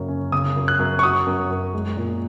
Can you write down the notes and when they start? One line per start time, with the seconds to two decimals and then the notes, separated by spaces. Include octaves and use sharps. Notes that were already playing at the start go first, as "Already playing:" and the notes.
Already playing: F#2 C#3 A#3
0.08 C#4
0.32 C#3 D#6
0.56 F#2
0.68 F#6
0.79 F#2
0.99 C#6
1.03 F#3 D#6
1.27 F#2
1.50 F#2
1.74 G#3
1.97 A#2